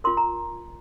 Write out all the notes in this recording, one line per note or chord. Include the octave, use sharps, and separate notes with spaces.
F4 A#4 C6
A#5